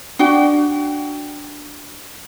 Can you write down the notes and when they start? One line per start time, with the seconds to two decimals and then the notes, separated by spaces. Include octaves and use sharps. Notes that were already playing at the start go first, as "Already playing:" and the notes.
0.19 D4 F#4 G5